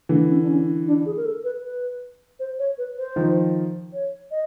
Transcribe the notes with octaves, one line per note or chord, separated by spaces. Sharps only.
D3 E3 A#3
C#4
D4
C#4
D4
G#4
A#4
A4
B4
B4
C5
C#5
B4
C5
D#3 F3
C#5
D#5